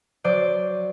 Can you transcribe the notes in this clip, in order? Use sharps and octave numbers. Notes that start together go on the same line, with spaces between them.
F#3 C5 D5 D6 D#7